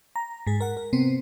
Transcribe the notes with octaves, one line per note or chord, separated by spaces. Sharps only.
A#5
G#2 G#4
A#4 F#5
A#4
C3 B3 C4